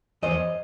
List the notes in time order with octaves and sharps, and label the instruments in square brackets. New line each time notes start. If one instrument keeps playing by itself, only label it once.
[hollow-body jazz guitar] E2 C5 D#5